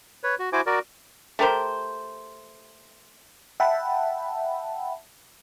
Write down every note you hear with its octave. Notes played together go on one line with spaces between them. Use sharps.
B4 C#5
F#4
E4 F#4 C5 G#5 D6
F#4 A#4 D5
A3 G4 A#4 C5
E5 F#5 G5 A5 B5